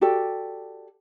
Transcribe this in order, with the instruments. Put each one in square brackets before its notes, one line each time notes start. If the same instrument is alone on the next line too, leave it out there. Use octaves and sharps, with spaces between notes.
[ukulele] F#4 G4 A4 D5